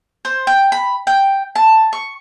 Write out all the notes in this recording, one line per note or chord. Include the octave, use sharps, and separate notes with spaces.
C5
G5
B5
G5
A5
C#6